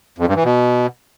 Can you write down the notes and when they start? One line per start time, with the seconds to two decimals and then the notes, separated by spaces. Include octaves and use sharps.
0.18 F2
0.27 G2
0.36 E3
0.44 B2